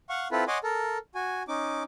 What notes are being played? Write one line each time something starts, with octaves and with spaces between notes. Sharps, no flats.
F5 F#5 C#6
C4 E4 F4 A4 B4
C#5 D#5 F#5 G#5 C6 D6
A4 A#4
F#4 G#5
C#4 D#4 D6